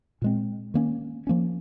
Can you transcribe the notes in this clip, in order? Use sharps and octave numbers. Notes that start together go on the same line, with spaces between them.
A#2 G#3 C4
D#3 A#3 C#4
F3 A#3 C#4